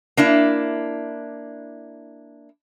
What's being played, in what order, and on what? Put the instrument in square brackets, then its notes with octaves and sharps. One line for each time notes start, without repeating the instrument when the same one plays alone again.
[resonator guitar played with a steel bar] A#3 D4 E4